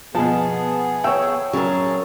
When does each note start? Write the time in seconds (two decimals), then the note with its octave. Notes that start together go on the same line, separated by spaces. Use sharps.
0.15 B2 F3 B3 G#4 A5
1.04 C#5 E5 G5
1.53 C#3 F#3 G#4 A#4 A5